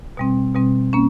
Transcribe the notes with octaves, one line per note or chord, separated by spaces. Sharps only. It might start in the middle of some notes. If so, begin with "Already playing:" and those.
B2 G3 C4
B2 G3 C4
A#3 C#4